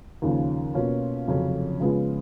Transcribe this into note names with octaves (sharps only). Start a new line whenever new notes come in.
D#2 C#3 F3
B2 A#3 C#4 F4
F1 F2 C#3 F#3 C#4
C#3 F3 G#3 B3 F4